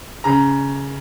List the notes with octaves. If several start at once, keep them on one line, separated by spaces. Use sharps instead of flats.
C#3 A#5